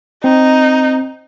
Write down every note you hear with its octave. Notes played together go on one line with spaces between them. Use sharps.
C4 D#4